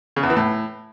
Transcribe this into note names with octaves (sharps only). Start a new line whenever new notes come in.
C#3
E2
E3
A2